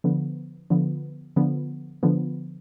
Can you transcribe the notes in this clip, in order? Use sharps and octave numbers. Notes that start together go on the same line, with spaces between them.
D3 F3 B3
D3 F3 B3
D3 F3 B3
D3 F3 B3